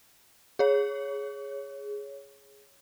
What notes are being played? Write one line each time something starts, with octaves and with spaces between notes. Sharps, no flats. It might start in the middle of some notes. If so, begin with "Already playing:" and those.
G#4 C#5